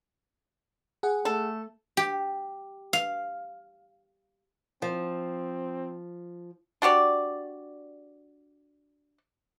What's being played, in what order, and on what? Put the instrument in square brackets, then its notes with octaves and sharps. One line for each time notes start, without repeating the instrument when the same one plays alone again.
[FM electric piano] G#4 F#5
[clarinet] A3 [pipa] A4
[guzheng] G4
F5
[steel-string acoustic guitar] F3 [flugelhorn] C4
[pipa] D4 F#4 G4 D5